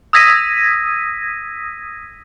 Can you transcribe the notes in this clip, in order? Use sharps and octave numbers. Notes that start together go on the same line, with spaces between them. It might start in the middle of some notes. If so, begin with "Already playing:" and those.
D#6 E6 G#6 A#6 B6 D#7